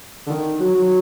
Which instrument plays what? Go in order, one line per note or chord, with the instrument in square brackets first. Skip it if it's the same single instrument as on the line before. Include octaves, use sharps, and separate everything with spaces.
[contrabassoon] D3
D#3
F#3
F#3